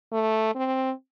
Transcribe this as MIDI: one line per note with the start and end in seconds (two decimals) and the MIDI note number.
0.12 0.55 57
0.55 0.92 60